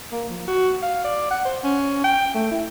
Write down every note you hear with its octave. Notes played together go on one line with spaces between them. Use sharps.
A#3
F3
F#4
F5
D5
F#5
C5
C#4
G5
A3
E4